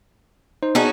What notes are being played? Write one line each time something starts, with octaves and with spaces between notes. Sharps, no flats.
D#4 C5
B3 C#4 D#4 F#4 G#4 A5